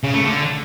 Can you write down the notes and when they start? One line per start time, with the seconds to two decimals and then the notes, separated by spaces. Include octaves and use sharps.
0.04 C#3
0.14 A3
0.25 D3